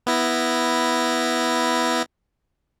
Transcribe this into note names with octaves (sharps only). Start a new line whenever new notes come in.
B3 E4 A#6